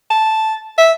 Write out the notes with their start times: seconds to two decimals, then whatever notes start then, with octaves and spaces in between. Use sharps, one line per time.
0.11 A5
0.78 E5